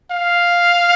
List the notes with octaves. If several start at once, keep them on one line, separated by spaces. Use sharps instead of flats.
F5